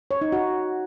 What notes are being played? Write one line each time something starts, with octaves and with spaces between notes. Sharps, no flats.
C#5
D#4
F#4